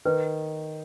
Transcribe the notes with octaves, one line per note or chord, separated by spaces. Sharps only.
D#3 B4